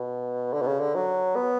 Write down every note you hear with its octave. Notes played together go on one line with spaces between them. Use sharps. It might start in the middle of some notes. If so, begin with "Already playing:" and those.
Already playing: B2
D3
B2
C#3
D3
F#3
B3